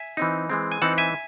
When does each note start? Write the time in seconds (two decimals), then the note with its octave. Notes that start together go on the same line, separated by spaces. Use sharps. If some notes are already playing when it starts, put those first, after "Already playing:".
Already playing: E5 G#5
0.17 E3 C4 D#4
0.50 E3 G#3 C4
0.72 G#5
0.82 E3 C4 D#4 F#5 A5
0.98 E5 G#5